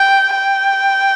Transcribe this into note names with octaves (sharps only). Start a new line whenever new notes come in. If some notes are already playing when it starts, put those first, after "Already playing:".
Already playing: G5
G5